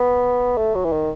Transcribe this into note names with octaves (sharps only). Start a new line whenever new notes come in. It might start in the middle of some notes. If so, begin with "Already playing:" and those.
Already playing: B3
A3
F#3
E3
D#3